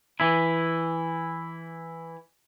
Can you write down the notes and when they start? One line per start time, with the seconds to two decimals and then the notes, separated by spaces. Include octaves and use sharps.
0.20 E3 E4